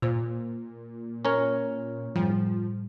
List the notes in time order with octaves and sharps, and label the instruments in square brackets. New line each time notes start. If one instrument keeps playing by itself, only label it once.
[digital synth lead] A#2 [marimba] F4 C5
[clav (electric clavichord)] C#4 A#4 C#5
[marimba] F#2 A2 G3 [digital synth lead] F3